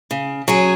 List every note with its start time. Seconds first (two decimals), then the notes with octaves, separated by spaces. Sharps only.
0.11 C#3
0.48 F#3 C#4 G#4